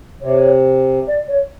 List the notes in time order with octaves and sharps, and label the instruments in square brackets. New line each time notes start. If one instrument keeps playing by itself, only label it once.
[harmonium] C3 [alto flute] C#5
[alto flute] D5
C#5